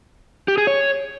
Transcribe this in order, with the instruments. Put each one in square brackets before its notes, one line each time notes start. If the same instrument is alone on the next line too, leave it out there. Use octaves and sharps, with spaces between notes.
[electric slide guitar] G4
G#4
C#5